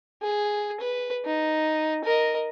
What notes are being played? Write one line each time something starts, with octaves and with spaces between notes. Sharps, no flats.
G#4
B4
D#4
A#4 D#5